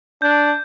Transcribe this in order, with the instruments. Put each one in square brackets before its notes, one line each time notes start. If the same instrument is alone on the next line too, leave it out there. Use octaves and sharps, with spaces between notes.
[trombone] D4 [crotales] G6